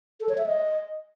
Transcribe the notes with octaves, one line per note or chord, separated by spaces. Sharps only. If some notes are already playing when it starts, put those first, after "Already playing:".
A4
C#5
E5
D#5